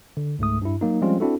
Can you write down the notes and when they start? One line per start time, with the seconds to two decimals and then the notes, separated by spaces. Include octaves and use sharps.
0.17 D3
0.39 C#2 G#2 A3 D#6
0.62 G2 E4
0.81 F#3 A#3 D#4
1.02 F3 G3 G#3 C4 C#4 F4
1.20 C4 D4 E4 F#4 A4